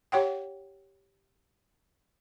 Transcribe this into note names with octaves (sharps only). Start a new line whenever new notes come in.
G4 C#5 F#5 G5